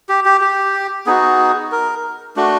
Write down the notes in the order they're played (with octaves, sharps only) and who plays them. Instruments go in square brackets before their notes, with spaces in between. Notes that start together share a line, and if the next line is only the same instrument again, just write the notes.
[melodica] G4
G4
G4
B3 D#4 F#4 G#4
A#4
A3 D4 F#4